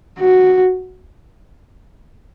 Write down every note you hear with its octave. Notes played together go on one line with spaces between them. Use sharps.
F#4